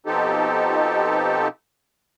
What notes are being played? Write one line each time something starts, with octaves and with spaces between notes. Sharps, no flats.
B2 F3 C4 D#4 G4 A4